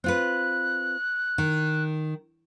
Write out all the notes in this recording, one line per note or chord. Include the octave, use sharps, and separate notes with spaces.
C4 F4 B4 F#6
D#3